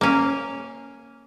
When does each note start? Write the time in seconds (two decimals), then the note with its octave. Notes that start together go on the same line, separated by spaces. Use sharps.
0.01 A#3 C#4